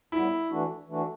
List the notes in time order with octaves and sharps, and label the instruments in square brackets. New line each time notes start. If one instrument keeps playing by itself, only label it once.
[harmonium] A2 G3 B3 [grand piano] E4
[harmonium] E3 A3 D4 F#4
E3 A3 D4 F#4